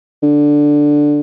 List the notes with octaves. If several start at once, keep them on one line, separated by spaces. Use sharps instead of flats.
D3